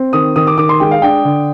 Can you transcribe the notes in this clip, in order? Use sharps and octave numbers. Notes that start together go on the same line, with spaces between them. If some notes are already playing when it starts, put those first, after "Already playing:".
Already playing: C4
D#3 D#6
D#3 D#6
D6
D#3 D6
C6
G#3 G5
F5
D4 G5
D3